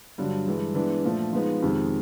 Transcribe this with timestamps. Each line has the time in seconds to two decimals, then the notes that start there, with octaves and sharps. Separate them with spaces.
0.18 G2 D3 F#3
0.47 G2 E3 G#3
0.75 E3 G#3 B3 D4
1.04 A#2 F3 A3
1.33 F3 G#3 B3 D#4
1.62 F2 C3 D#3 G#3